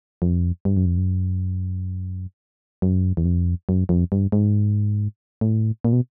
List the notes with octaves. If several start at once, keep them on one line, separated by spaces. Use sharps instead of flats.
F2
G2
F#2
F2
F#2
F#2
E2
F2
F#2
F2
G2
G#2
A2
A#2
B2